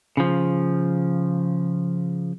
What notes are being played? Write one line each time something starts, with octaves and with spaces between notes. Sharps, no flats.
C#3 F3